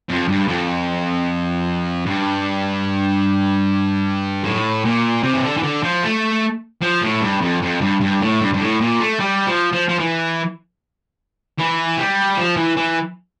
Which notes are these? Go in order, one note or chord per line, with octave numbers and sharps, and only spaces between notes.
F2
G2
F2
G2
A2
A#2
C3
E3
D3
E3
D3
F3
A3
F3
A2
G2
F2
F2
G2
G2
A2
G2
G2
A2
A#2
A3
G3
F3
F3
F3
E3
E3
G3
F3
E3
E3